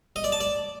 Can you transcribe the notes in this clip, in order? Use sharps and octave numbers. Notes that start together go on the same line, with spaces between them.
D#5
D5
A5
D5